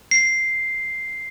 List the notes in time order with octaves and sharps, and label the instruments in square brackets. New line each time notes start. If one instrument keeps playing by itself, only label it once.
[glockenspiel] C7